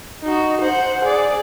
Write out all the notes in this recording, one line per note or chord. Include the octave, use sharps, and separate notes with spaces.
D#4 F#4
C5 F#5
G#4 D5